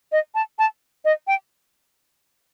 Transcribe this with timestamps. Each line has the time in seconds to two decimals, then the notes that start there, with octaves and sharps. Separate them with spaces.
0.12 D#5
0.35 A5
0.59 A5
1.05 D#5
1.27 G5